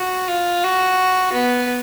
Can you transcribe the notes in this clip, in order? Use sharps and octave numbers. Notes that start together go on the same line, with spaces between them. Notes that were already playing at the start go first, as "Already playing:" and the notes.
Already playing: F#4
F4
F#4
B3